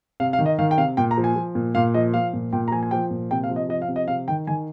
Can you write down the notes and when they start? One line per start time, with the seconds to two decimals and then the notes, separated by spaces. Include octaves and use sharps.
0.20 C3 F5
0.33 F5
0.39 D#3
0.46 D#5
0.59 D#3 F5
0.71 G5
0.78 C3 F5
0.97 A#2 G5
1.11 A#5
1.18 F3
1.24 G#5
1.36 F3
1.55 A#2
1.75 A#2 F5
1.94 F3 D#5
2.14 F3 F5
2.33 A#2
2.53 A#2 G5
2.68 A#5
2.72 F3 G#5
2.83 G#5
2.91 F3 G5
3.11 A#2
3.31 C3 G5
3.44 F5
3.49 F3
3.56 D#5
3.69 F3 D#5
3.82 F5
3.88 C3
3.96 D#5
4.08 C3 F5
4.28 D#3 G5
4.47 D#3 G#5